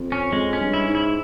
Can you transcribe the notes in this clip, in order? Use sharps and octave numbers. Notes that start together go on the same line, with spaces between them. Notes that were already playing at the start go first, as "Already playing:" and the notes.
Already playing: F2
C#4
F2 G#3
C#4
G2
E4
G#2
E4